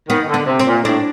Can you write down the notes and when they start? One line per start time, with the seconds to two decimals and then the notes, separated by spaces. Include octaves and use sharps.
0.09 D#3 B3
0.28 D3
0.34 B3
0.47 C3
0.59 C4
0.66 A#2
0.84 A2 D4